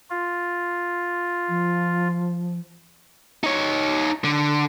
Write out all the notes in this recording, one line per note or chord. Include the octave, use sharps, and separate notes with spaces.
F4
F3
D#4 C#5
D3